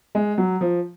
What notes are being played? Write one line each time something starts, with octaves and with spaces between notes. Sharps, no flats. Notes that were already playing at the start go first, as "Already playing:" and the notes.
G#3
F#3
F3